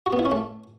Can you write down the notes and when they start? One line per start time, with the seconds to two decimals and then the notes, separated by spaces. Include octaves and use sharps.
0.06 F#4
0.13 B3
0.19 E4
0.25 C#4
0.32 A3